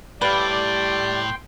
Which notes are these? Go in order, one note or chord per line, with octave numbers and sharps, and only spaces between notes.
A2 G3 B4 D5 F5 G5 C6